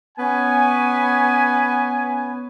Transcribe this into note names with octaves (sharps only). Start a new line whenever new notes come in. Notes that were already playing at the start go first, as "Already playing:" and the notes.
B3 C#4 G#5